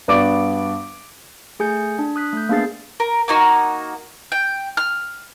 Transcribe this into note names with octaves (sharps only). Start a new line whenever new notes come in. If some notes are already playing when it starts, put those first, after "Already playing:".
G2 B3 F#4 D5 D6 D7
A3 G#4 G#5 G6 C#7
D4
D#6 F#6 B6
A3 G6
A#3 B3 D4 G#4 A6 C7
A#4
A#3 D#4 F#4
G5
F6